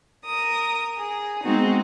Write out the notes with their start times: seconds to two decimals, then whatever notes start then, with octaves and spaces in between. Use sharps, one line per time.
0.25 A#4 D#6
0.98 G#4
1.44 G#3 B3 C4 D#4 F#4